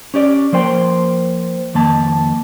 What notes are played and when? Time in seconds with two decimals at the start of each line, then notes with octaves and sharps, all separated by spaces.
0.14 C#4 G4 D5
0.53 F3 A#3 C5 G5
1.74 F2 D#3 A#3 A5